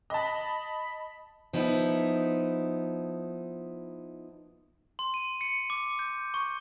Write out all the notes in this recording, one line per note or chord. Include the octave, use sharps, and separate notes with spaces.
D#5 A5 B5
F3 B3 D#4 E4
C6
D#7
C#7
D6
G6
C#6